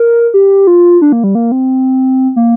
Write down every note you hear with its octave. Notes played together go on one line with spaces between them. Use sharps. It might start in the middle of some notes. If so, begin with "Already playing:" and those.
Already playing: A#4
G4
F4
D4
A#3
G3
A#3
C4
A#3